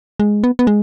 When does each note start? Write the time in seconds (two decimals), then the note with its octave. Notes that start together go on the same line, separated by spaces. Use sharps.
0.20 G#3
0.44 B3
0.59 B3
0.67 G#3